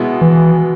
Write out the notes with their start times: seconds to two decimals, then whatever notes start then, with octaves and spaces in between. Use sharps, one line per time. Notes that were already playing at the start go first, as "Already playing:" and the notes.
Already playing: B2 G#3 B3 E4
0.21 E3